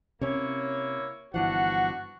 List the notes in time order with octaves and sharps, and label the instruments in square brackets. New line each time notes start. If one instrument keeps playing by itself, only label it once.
[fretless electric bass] C3 C#4 [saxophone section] A#3 E4 C#5
[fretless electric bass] G1 E3 F3 [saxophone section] D4 F#5 [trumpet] F#4